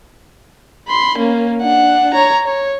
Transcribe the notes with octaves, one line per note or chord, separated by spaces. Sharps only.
B5 C6
A#3 C#4
D4 F#5
C#5 A#5
C#5